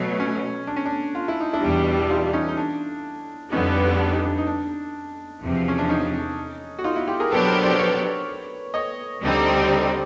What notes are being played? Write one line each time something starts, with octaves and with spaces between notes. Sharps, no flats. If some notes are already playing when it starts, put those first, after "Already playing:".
Already playing: B2 F#3 A3
C#4
D4
C#4
D4
F4
E4
D#4
D4 E4
E2 B2 G3
D#4 F4
C#4 D#4
D#4
D4
F2 D3 G3 B3 C#4 D#4
D4
D#4
D4
D#4
D4
E2 C3 F3
C#4
D4
C#4 D#4
F#4
D#4 F4
E4 F#4
F4 G4
G#4 A#4
B2 F#3 B3 D4 G4 A4 B4
A#4 C5
C5 D5
B4 C#5
C#5 D#5
D2 D3 G3 C4 D#4
D#5
D5